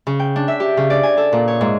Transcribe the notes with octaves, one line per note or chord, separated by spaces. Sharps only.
C#3
G5
D4
E5
G4
C#3
D5
G#5
A4
A#2
C#5
G#2